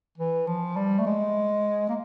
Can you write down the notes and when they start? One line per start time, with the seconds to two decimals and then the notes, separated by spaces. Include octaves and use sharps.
0.18 E3
0.47 F3
0.76 G3
0.99 A3
1.06 G#3
1.89 A#3